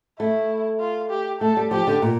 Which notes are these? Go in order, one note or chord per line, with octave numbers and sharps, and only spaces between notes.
A3 E4
F4
G4
A3 A4
G3
F3 G4
D3
A#2